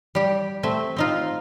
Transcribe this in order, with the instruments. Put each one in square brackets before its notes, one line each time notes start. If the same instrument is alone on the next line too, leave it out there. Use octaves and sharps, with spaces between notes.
[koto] G3 G4
A3 C4 E5
C4 D#4 F4